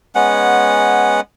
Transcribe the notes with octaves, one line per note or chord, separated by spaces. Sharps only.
G#3 B3 C#4 F#5